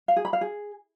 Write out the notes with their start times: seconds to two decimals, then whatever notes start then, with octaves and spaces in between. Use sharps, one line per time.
0.08 F5
0.16 G#4
0.25 B5
0.33 F5
0.41 G#4